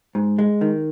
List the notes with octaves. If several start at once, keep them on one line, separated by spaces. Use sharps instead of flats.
G#2
G#3
D#3